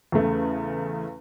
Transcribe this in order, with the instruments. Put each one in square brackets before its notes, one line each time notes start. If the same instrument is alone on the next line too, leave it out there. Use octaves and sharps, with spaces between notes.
[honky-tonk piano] E2 C#3 A3